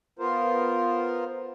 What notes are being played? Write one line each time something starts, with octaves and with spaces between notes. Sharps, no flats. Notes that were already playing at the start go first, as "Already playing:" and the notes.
B3 F4 A#4 C5